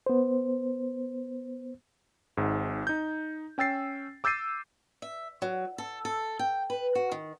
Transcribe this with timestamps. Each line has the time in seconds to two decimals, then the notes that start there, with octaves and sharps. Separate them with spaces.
0.06 B3 C5
2.37 G#1 G#2
2.87 D#4 G6
3.58 C#4 G5 E6 A6 C7
4.24 D6 E6 G6 A6 C7 D#7
5.02 E5
5.42 F#3
5.78 A4
6.05 A4
6.39 G5
6.70 B4
6.95 F#4
7.12 D#3